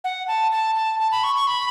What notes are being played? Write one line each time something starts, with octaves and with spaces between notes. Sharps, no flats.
F#5
A5
A5
A5
A5
B5
C#6
C#6
B5